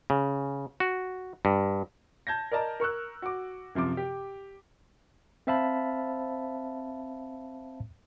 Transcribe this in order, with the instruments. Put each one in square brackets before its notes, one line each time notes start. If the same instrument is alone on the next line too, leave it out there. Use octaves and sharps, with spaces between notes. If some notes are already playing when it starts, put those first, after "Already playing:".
[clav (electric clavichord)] C#3
F#4
G2
[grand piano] A5 G6 G#6 A#6
A#4 D5 D#5 A5 A#5
A#4 C#6 E6 F#6
F#4 D6
F#2 C3 F3 D6
G4
[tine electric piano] C4 C5 E5 F5 A5 B5